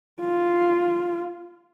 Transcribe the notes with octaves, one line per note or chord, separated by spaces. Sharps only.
F4